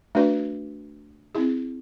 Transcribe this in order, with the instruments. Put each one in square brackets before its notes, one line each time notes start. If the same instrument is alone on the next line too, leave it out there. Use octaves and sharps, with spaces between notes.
[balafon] A3 D4 F#4 B4 D5
C4 E4 G#4